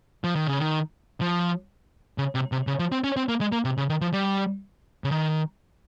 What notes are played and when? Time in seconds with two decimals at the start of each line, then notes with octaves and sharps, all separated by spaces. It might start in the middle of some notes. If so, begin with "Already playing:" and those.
0.24 F3
0.35 D#3
0.47 C#3
0.59 D#3
1.21 F3
2.18 C#3
2.35 C3
2.52 C3
2.67 C#3
2.79 F3
2.92 C4
3.04 C#4
3.17 C4
3.29 A#3
3.41 G#3
3.52 A#3
3.65 C3
3.78 C#3
3.89 D#3
4.01 F3
4.13 G3
5.04 C#3
5.11 D#3